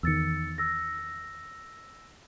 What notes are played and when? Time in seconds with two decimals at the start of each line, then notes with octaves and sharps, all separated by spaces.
0.03 E2 D#3 E6 A6 C#7
0.58 E6 A#6